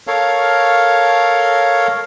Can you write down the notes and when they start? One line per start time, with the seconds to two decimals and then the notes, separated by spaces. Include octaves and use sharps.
0.07 A4 A#4 C#5 F5